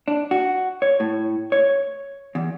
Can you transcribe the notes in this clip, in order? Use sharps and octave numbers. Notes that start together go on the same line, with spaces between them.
D4
F#4
C#5
A2
C#5
E2